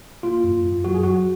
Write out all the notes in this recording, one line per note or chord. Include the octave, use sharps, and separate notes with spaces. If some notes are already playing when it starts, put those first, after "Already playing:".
A#3 F4
F#2
F#2
F#3 F#4
G#4
F#3 F#4